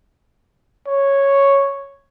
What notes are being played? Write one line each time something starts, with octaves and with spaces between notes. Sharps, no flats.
C#5